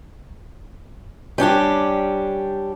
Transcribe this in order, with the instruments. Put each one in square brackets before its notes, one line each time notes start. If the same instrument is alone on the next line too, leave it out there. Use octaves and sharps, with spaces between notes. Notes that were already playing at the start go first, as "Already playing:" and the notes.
[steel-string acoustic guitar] G3 C#4 D4 G4